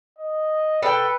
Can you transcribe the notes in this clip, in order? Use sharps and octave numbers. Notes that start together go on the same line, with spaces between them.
D#5
A4 B4 G5